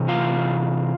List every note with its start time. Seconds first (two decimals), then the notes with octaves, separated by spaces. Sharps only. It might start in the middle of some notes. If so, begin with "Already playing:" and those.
Already playing: C3 E3
0.08 F4 F5